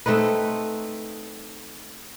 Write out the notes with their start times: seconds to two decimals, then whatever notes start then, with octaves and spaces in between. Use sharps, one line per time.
0.06 A3 C4 D#4 B4